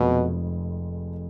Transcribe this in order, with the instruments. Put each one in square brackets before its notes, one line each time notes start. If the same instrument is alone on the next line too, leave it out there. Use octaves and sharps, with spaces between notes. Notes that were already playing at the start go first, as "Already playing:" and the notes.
Already playing: [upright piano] F1 F2 F3 G#3 [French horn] B2